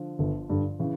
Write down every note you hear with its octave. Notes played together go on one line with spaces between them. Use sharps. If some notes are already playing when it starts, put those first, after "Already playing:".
Already playing: D3 F3
G1
G2 D3
C#3 E3